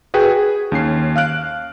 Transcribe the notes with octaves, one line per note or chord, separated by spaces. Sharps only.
F#4 G#4 B4 G5
G#4
D#2 C#4 C7
F5 F6 F#6 D7